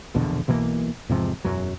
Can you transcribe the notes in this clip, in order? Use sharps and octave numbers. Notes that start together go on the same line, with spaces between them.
A#1 E2 B2 D3
B1 B2 E3 A#3
E2 G#2 C3 F3
E1 F#2 F#3